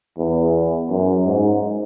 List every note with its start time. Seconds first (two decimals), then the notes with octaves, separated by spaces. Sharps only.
0.18 E2
0.90 F#2
1.26 G#2